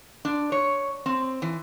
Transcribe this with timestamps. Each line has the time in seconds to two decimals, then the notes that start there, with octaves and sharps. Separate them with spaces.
0.25 D4
0.52 C#5
1.06 C4
1.42 E3